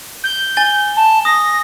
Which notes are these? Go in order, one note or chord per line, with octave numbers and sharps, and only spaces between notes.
G6
G#5 A6 G7
A5
D#6 A#6